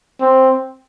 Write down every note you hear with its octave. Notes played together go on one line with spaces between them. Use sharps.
C4